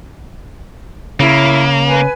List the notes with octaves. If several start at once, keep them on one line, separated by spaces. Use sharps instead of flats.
C#3 A#3 E4 C#5
B4 G#5